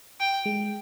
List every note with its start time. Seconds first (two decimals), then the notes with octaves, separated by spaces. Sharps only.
0.20 G5
0.46 G#3